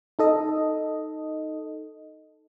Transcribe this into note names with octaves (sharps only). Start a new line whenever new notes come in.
D#4 A4 D#5